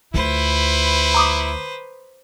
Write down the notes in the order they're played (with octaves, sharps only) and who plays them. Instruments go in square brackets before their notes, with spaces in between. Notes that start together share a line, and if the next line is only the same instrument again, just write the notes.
[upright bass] D2 F4 [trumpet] E4 [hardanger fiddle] B4 C5
[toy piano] A#5 D6 D#6